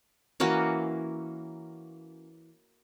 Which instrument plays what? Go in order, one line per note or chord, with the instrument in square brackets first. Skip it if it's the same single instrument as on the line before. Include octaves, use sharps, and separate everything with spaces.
[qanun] E3 A#3 C#4 F#4